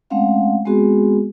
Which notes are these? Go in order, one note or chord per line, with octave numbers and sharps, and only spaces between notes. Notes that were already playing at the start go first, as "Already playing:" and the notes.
G#3 A3 C4 C#4 F5 F#5
G#3 B3 C4 F#4 G#4